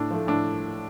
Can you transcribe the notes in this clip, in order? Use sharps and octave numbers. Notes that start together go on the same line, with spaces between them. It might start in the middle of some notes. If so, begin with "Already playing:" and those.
Already playing: A2 D4
F3 A3
A2 D4